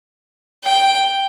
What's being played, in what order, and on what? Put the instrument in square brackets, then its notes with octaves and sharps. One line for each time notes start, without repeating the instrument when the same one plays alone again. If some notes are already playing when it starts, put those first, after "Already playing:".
[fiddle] G5